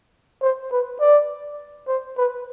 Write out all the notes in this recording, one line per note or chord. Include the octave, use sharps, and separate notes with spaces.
C5
B4
D5
C5
B4